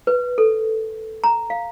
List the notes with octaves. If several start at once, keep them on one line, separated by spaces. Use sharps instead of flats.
B4
A4
A#5
F5